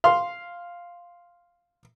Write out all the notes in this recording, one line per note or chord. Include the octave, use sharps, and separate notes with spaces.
F5 C6